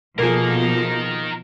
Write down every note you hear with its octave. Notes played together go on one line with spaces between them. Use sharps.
B2 F3 A#3 D#4 G#4 A#4